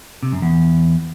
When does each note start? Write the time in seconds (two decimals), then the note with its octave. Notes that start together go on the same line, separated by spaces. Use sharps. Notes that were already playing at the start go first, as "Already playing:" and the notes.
0.23 C3
0.32 F#2
0.42 E2